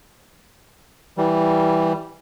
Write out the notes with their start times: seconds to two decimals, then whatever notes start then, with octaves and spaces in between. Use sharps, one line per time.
1.18 E3 G3